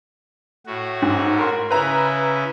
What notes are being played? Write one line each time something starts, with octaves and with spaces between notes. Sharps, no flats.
A2 F#4
G#2
A#4 C6
C#3 E4 B4 A#5